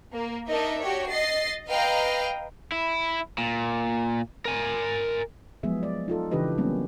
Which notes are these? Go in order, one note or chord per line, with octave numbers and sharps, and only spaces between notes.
A#3
D4 D#4 A#4 D#5 E5
F#4 G4 C#5
D#5 A6 C7
B4 D#5 F5 G5 A#5
E4
A#2
A#4 G#5
F3 F#3 G#3 B3 G#4 E5
D5
D#4 F4 A4
C#3 E3 D4 G4 B4 D#5
F#3 G3 A#3 B3 C#4